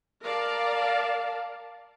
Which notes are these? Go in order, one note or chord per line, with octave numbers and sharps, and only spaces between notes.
A#4 D5 F5 A5